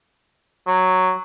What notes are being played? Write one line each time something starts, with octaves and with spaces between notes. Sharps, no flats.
F#3